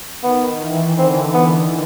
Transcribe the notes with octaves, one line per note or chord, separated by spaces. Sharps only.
D#3 B3
E3
D3 C4
B3